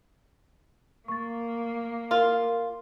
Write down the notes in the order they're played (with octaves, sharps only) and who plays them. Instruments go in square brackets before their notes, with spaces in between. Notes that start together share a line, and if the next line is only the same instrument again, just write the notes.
[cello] A#3 [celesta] C#6 A6
[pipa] F4 [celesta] A#4